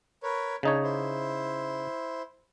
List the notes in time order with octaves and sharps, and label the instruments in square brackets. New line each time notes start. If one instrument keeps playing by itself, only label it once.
[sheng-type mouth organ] A#4 B4 C#5
[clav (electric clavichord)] C#3 D#4 C#5 [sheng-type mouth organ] D4
[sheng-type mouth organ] E4 C5